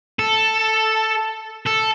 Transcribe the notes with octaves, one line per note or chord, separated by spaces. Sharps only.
A4
A4